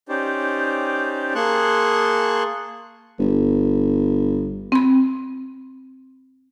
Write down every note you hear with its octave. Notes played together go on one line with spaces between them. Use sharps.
C#4 D#4 G4 C5 D5
A#3 G#4 A5 C6 C#6 F#6
G1
C4 B5